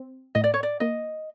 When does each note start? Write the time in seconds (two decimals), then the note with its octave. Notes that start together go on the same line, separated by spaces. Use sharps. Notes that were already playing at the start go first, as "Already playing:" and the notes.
Already playing: C4
0.35 A2 D#5
0.44 D5
0.54 C#5
0.63 D5
0.80 A#3 D#5